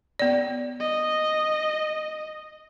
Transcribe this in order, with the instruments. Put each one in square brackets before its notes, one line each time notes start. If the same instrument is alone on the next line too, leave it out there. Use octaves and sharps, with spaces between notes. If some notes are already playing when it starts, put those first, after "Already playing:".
[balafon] B3 D5
[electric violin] D#5